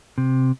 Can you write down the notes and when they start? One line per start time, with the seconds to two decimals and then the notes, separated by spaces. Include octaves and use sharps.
0.18 C3